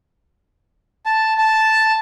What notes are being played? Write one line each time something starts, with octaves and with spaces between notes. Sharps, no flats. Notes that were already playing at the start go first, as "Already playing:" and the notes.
A5
A5